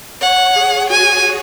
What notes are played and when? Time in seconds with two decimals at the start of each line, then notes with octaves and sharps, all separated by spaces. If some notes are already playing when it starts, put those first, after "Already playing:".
0.21 C#5 F#5
0.56 G#4
0.90 F#4 G#5